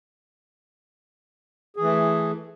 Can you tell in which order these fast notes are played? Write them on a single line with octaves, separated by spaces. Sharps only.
G#4 E3 A3